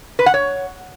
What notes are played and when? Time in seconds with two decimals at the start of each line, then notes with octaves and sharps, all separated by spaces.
0.19 B4
0.26 F#5
0.34 C#5